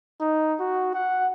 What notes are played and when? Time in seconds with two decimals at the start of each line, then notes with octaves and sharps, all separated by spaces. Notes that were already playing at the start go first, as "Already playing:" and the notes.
0.20 D#4
0.59 F#4
0.94 F#5